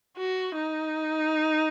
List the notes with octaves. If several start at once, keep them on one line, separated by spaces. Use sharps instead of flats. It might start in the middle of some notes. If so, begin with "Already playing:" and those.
F#4
D#4